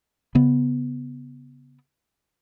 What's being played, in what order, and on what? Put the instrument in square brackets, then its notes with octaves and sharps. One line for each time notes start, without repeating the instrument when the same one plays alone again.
[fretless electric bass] C#3 B3